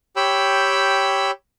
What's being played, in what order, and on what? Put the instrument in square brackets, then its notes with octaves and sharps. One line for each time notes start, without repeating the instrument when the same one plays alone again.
[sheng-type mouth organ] G4 C#5 G5 B5 E6